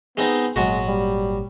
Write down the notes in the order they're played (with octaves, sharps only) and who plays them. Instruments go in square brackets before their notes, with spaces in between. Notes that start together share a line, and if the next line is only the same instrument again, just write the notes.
[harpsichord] G#3 C4 D#4 [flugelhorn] B3
[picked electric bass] G#1 A#2 [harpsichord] F#3 B3 F#4 [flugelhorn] G#3
[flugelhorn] G3